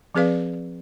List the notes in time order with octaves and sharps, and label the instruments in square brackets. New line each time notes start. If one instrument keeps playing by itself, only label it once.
[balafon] F3 C4 G#4 B4 D5 F5